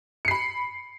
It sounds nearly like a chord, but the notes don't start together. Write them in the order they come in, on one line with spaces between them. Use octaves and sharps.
C#7 C7 B5